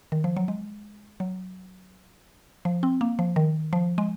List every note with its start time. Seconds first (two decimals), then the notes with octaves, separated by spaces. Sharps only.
0.12 D#3
0.24 F3
0.37 F#3
0.48 G#3
1.20 F#3
2.65 F3
2.83 C4
3.01 A#3
3.19 F3
3.36 D#3
3.73 F3
3.98 G#3